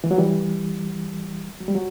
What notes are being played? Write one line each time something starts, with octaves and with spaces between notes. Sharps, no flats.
E3
F#3
E3 G3
F#3
G3
F#3